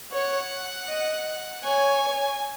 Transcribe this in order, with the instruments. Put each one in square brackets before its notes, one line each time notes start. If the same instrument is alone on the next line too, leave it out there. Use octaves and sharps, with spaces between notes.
[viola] C#5 [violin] F#5
[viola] D#5
[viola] C#5 [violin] G#5